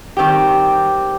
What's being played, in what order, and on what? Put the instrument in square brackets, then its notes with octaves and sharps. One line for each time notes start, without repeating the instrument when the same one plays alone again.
[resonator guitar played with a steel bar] D#3 G3 C4 G4